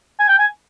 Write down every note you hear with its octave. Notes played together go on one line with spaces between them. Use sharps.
G#5
G5
G#5